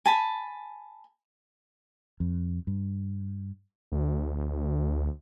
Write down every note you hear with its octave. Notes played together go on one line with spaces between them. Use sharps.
G#5 A5 B5
F2
G2
D2